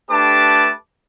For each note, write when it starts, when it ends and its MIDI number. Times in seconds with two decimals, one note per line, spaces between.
0.11 0.72 57
0.11 0.72 62
0.11 0.72 67
0.11 0.72 71
0.11 0.72 81
0.11 0.72 86